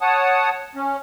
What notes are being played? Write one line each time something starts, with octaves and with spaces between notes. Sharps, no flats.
C#5 F#5 A5 D#6
C#4